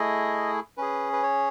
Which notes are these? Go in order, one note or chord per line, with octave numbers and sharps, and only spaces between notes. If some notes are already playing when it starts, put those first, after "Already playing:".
Already playing: A3 E4 G#4 D#5
C#4 G#4 B4
B4
C#5